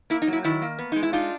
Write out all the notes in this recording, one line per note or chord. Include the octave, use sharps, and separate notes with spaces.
A#3 E4
D#4
F#3
E4
D#3 E4
A#3
B3
G#3 D#4
E4
D4 D#4 F4